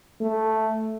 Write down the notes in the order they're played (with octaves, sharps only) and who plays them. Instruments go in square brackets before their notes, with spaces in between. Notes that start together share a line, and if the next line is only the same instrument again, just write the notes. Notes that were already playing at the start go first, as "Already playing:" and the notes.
[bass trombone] A3